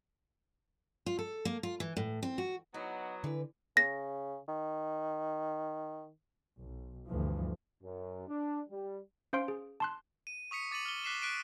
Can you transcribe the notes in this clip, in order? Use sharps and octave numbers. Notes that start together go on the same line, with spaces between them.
F4
A4
A#3
F4
E3
A2
C4
F#4
F#3 B3 D#4
D3 E3 B4
C#3 A#6
D#3
B1
D2 G2 E3 F3
F#2
D4
G3
C#4 C5 F5 C6 D7
G#4
A5 C6 F#6
D#7
C#6 D#6 B6 C#7
D6 A6 C#7 D#7 F#7
F6 G7
D6 F#6 B6 C7 E7 G7
F#6 B6 D7 D#7